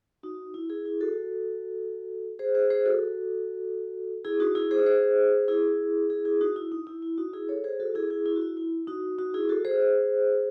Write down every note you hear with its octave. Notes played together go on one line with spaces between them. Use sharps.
D#4 F#4
E4
E4 G#4
E4 G#4
F#4 A4
G#4 C5
G#4 C5
G#4 C5
F#4 A4
E4 G#4
D#4 F#4
E4 G#4
G#4 C5
G#4 C5
E4 G#4
E4 G#4
E4 G#4
D#4 F#4
E4
D#4
E4
E4
D#4 F#4
E4 G#4
A4 C#5
G#4 C5
F#4 A4
E4 G#4
E4 G#4
E4
F#4
E4
E4
D#4 F#4
D#4 F#4
E4 G#4
F#4 A4
G#4 C5